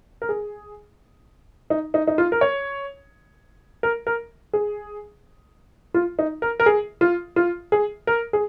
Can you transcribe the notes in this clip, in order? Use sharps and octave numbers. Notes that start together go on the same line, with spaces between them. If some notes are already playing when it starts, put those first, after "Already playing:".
A#4
G#4
D#4
D#4
D#4
F4
A#4
C#5
A#4
A#4
G#4
F4
D#4
A#4
A#4
G#4
F4
F4
G#4
A#4
G#4